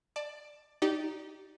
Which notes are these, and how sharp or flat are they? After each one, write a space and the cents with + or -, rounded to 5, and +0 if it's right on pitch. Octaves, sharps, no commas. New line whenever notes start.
D5 +15 A5 +0
D#4 +0 G4 -20 D5 +0